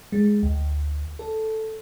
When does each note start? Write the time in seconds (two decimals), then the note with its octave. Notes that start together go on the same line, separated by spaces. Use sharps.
0.12 G#3
0.43 D2
1.19 A4